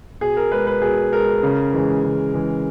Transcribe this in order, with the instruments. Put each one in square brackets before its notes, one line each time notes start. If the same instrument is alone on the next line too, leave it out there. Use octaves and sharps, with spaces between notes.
[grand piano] B2 G#4
A#4
G#3 B4
B4
B2 G#4
G#3 A#4
C#3
E3 G#3
C#3
E3 G#3